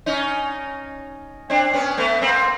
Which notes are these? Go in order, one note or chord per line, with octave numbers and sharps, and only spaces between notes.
C#4 D#4
C4 D4
B3 C#4
A3 B3
A#3 C4